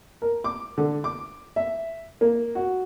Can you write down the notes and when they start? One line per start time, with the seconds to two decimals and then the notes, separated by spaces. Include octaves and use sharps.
0.22 A#4
0.44 D6
0.78 D3
1.04 D6
1.56 E5
2.21 A#3
2.55 F#4